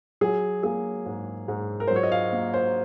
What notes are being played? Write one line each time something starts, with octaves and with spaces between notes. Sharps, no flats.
F#3 G#4
A#3 G#4
G#2
G#2
A#4
C5
F#3
C#5
D#5
F5
A#3
C5